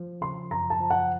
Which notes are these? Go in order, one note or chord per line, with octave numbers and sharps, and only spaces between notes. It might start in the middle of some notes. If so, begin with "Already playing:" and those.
Already playing: F3
C#3 C6
F#2 A#5
A5
F3
F#5